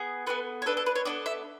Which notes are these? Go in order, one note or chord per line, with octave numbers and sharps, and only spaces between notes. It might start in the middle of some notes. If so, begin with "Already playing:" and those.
Already playing: B3 G#4
B3 D4 A4 B4
C#5
B3 D4 A4 B4
A4
B4
C#5
B3 D4 A4 D5
E5